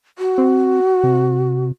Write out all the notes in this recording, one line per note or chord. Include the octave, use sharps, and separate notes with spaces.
F#4
C4
C3